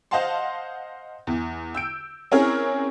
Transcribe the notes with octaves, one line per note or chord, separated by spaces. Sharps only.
C5 D#5 F5 F#5 A5 C6
E2
E6 G6 D7
C4 C#4 E4 G#4 A#4 C#5